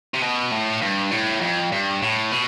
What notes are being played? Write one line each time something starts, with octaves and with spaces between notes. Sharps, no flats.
C3
B2
A2
G2
A2
F2
G2
A2
B2